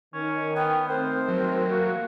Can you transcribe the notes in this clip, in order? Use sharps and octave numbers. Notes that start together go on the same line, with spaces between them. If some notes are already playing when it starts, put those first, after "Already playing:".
D#3 C#4
B3 G5
D#3 A3 C4 A#4 C5
F#3
A#3 F#4